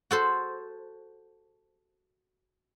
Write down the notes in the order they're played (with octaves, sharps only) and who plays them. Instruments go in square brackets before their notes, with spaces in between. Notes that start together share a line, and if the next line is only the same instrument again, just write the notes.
[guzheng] F#4 A4 C5